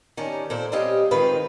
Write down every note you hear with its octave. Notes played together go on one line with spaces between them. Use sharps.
D#3 C#4 D4 G4
A#2 A4 C5 D5
G3 C4 C#4 G4 D#5 F5
D#3 G#3 C4 D#4 F4 B4